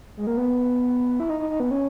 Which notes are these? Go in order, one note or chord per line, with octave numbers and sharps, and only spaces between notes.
G#3
A#3
B3
E4
D#4
D#4
D#4
B3
C#4